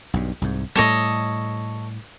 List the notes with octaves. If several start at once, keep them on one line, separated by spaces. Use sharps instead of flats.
B1 G2
C2 G#2
A2 G3 A4 C#5 D#5